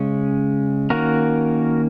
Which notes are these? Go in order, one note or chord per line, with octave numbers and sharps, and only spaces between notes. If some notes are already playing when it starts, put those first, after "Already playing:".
Already playing: C#3 G#3 C#4
D#3 A#3 C#4 F#4 A#4